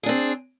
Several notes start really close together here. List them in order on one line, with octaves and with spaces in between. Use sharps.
G#4 D4 C4